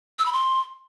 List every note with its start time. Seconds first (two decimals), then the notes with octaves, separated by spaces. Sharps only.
0.19 E6
0.26 B5
0.33 C6